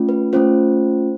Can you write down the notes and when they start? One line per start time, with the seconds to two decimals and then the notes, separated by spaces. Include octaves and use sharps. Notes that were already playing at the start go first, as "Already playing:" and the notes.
Already playing: A3 C#4 F4
0.09 B4
0.33 A3 C#4 F4 C5